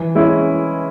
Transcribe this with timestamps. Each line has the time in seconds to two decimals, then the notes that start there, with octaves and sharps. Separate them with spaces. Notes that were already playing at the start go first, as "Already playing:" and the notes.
Already playing: E3
0.15 G#3 C#4 E4